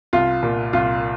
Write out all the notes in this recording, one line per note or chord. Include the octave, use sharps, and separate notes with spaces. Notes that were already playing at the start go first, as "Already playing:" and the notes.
C2 F4
A#2
C2 F4